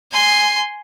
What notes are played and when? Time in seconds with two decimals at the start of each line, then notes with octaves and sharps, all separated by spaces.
0.12 G#5 C6